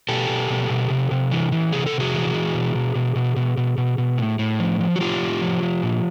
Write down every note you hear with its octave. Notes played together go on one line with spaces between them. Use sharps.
B2 G4 A4
B2
B2
B2
C3
C3
E3
E3
C3 G#4
A4
C3
F#4 G#4
E3
E3
B2
B2
B2
B2
B2
B2
B2
B2
A2
A2
F3
F3
F#4
A2 F4 G4
A2
F3
F3
A#2